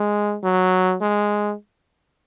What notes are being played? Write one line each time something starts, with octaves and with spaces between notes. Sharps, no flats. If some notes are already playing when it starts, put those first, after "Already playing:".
Already playing: G#3
F#3
G#3